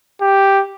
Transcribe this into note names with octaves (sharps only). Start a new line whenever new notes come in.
G4